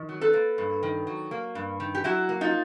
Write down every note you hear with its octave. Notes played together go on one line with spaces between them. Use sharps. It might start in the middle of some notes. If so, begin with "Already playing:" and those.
Already playing: D#3
F#3
A4 B4
A#3
G2
D#3
F#3
A#3
G2
D#3
G4
F#3 E4 F#4
A#3
D#4 F4